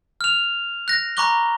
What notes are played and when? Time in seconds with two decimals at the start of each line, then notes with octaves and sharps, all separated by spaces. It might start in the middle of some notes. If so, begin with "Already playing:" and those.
0.21 F6 F7
0.88 F#6 A#6
1.17 A#5 B5 C#6 D6 F#6 G7